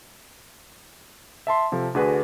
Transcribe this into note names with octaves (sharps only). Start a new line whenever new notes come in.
E5 A5 C6
C3 F3 A4
D2 D3 F#4 G#4 B4